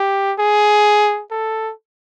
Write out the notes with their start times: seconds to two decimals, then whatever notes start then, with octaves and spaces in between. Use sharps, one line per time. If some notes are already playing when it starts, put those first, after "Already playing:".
Already playing: G4
0.39 G#4
1.31 A4